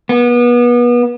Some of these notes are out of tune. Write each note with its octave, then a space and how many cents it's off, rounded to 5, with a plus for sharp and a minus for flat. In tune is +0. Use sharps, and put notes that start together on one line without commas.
B3 -30